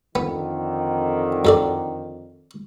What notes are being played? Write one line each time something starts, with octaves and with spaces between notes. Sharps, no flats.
F2 D3 D#3 B3
F#2 A4 D5